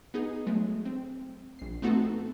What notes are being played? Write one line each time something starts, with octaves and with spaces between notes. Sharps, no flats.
B3 D#4 G#4
F#3 G#3 A3
C4
A#1 C7
A3 B3 C4 D#4 F#4 A4